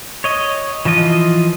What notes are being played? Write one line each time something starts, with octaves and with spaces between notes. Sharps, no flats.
C#5 D#5
E3 F3 F4 D#5